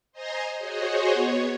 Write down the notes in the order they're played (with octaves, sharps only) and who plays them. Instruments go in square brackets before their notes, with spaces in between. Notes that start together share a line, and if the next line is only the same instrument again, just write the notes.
[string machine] C5 D#5 G#5 A#5 C6
F#4 G#4 C5 C#5 D#5
B3 C#5